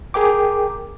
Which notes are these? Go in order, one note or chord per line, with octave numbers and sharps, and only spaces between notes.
G#4 A#4 G5 D6